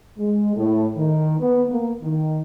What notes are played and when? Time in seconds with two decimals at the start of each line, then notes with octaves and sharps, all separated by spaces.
0.18 G#3
0.56 A2
0.96 D#3
1.40 B3
1.69 A#3
2.03 D#3